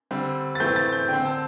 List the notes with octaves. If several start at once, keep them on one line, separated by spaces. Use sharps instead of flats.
D3 G3 C4
A6
A2 E3 A3 C4 G6
A6
G6
D3 C4 G5
A5